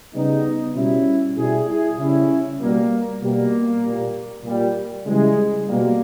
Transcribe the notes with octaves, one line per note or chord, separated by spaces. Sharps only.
C#3 G3 B3 D#4
B2 G3 C#4 E4
B2 G3 E4 G#4
E4 G#4
C#3 G3 C#4 E4
B2 G3 A#3
B2 G3 A#3
A#2 G3
A#2 G3
C#3 E3 G3 G#3
B2 G3 A#3